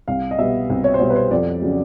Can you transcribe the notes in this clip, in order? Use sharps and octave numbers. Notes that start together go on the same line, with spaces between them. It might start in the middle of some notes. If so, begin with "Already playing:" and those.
C2 F5
D#5
B2 G3 B3 E5
C2
C#5
C5
B2 G3 B3 C#5
B4
C5
F2 D5
C#3 F#3